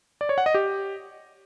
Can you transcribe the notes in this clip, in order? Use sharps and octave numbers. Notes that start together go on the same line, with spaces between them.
D5
C#5
F#5
D#5
G4